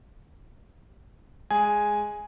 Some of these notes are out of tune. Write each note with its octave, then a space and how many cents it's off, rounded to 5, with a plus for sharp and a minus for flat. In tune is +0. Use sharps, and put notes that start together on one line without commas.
G#3 +0 G#4 +0 G#5 +0